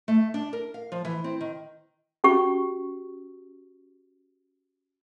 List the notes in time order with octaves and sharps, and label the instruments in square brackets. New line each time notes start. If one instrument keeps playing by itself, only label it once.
[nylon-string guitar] A3
D4
A#4
F5
F3
E3
C4
D#3
[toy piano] C#4 F#4 G4 C#6